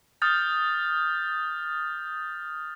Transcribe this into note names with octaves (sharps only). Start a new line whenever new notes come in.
D#6 F6 G6 A6